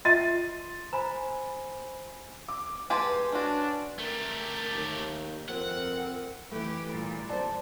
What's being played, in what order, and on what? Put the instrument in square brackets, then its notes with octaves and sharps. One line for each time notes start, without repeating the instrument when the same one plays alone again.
[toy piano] F4 D#5 E5 [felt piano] C6 A6 D#7
[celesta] C5 G#5 B5 [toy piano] A#5
[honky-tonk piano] D6
[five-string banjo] G#3 G4 A5 [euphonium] B4 [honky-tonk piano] G#5 C6
[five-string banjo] C#4 F#4 [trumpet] D4
[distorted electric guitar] A3 G4 [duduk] A#4
[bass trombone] D#2
[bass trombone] F2 [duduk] C4 [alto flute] A#4 [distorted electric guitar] F#5
[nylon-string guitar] E3 A3 [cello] G4 B4
[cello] A#2 G3
[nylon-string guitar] B2 C5 [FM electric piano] D5 A5